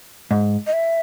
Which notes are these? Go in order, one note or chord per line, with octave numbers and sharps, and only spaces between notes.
G#2
D#5
E5